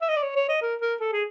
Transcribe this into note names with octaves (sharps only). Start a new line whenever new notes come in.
E5
D#5
D5
C#5
C#5
D#5
A#4
A#4
A4
G#4